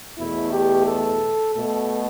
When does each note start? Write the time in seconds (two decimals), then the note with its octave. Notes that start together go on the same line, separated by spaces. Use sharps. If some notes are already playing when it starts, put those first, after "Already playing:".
0.18 E2 B2 A3 E4
0.52 G4
0.86 A4
1.54 B2 A3 A4